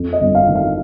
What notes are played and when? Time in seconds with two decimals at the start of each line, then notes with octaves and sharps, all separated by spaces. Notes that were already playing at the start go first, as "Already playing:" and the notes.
Already playing: F2
0.13 D#5
0.21 G1
0.35 F5
0.48 D#3
0.55 F5